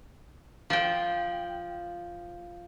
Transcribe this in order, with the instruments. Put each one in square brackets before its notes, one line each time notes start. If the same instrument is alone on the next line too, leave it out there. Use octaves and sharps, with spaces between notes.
[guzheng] F3 G5